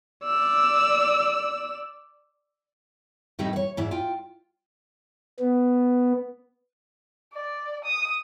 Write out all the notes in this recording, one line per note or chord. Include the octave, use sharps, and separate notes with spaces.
D5 E6
A2 G3 A3 C4 D#4
B4 C#5
G#2 E4 D5
F4 G5
B3
D5
D#6